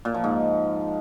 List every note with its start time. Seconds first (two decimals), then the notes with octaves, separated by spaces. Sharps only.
0.05 A#2
0.14 F3
0.24 G#2